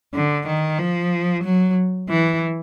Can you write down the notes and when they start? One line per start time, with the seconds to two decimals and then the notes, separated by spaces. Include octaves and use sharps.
0.14 D3
0.47 D#3
0.79 F3
1.43 F#3
2.09 E3